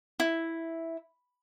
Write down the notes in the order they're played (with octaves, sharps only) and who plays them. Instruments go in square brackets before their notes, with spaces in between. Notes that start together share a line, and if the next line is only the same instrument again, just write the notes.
[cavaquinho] E4